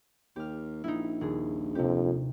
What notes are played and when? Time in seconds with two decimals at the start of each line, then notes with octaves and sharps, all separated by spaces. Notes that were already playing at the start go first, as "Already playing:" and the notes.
0.36 D#2 G4 F6
0.84 A#1 D#4 E4
1.21 D#1 G#4
1.75 F2 C3 G4